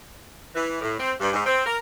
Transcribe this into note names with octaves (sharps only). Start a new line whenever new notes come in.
E3
A2
C4
G2
G#2
C4
A#4